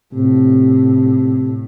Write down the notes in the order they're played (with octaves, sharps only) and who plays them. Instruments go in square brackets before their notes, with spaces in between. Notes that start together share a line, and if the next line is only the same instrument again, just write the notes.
[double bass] A2 [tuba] C3